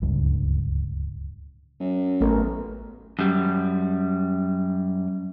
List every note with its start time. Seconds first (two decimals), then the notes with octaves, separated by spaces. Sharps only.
0.02 D1 C#2 G2
1.80 F#2
2.21 A1 A3 B3 A#4
3.19 F#2 G3